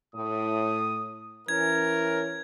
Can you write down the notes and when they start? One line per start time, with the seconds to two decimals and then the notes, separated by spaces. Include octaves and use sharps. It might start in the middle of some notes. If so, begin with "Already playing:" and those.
0.15 A2 D#6
1.48 E3 C#4 A#4 G#6